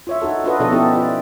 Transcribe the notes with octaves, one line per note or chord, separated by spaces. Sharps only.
F4 C#5 E5
D#4 F#4 A4
D4 F4 F#4 A4 B4 D#5
B2 F3 D4 G#4 A4 D#5
B3 C#4 D#4 E4 G4 A4
F4 D5